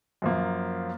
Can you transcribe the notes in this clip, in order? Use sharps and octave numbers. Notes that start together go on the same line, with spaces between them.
F#2 F3 A#3